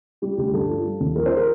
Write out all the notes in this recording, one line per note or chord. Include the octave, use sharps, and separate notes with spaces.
G3 G4
D2 G4
G2 A4
F3
G3
D#2
F3 A#4
C5
A#4